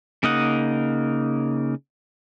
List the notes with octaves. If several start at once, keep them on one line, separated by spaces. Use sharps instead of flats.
C#3 A#3 D#4 D#5 F#5